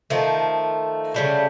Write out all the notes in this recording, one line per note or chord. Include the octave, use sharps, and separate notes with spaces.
D#3 F3 A3
C#3 G3 A3